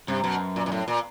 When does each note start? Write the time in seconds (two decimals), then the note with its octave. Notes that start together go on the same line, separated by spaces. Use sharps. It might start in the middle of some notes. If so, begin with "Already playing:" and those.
0.08 G2 C3
0.24 F#2 B2
0.56 A#2
0.66 A#2
0.72 A2
0.88 A#2